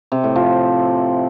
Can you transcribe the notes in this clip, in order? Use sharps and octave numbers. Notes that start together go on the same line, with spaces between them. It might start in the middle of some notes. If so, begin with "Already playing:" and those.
C3
A2
F3